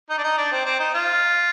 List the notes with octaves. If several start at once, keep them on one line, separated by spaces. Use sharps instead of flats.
D#4
D4
D#4
D4
C4
C4
D#4
F4